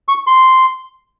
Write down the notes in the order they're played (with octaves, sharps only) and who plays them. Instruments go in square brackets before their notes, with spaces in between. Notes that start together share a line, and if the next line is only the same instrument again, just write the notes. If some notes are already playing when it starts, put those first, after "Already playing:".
[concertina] C#6
C6